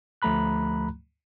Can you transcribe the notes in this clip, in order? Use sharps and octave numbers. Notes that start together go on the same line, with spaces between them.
D2 F3 A3 A#5 B5 F#6